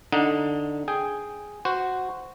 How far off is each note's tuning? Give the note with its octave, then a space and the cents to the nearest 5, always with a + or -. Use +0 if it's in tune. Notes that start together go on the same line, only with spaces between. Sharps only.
D3 +5 D#4 +5 F#5 -30
G#4 +0 G5 +0
F#4 +0 C5 -10